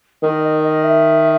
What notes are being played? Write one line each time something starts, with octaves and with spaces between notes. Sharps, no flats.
D#3 D#5
D#5
D#5
E5